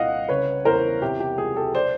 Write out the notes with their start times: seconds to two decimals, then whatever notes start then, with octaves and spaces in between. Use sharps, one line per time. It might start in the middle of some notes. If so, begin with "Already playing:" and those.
Already playing: C2 A#2 D#5 F5 F#5
0.29 C#3 B4 C#5
0.65 E2 A#4 C5
1.02 C3 G4
1.20 G4
1.38 C#2 G#4
1.56 G4 A4
1.74 C5 D5